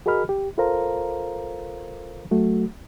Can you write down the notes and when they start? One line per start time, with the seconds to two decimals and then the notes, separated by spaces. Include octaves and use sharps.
0.06 F#4 G#4 A#4 D#5 B5 F6
0.29 G4
0.58 F4 A4 A#4 C5 F5 A#5
2.31 F#3 A3 F#4